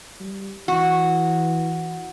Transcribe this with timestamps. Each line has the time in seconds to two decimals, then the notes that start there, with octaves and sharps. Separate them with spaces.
0.20 G3
0.68 E3 F#4